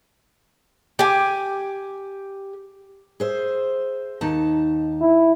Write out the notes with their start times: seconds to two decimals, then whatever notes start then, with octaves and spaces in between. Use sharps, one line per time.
0.99 G4 G#5
3.20 G#4 C5 E5
4.21 D#2 D#4 A5
5.02 E4